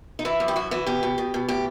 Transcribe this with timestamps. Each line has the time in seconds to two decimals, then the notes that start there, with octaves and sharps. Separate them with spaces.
0.19 D#4
0.25 E3 E4
0.40 F#2
0.48 G4
0.56 E3 F#4
0.71 E3 F#4
0.86 B2 G4
1.03 B2
1.18 B2
1.34 B2
1.49 A2 G4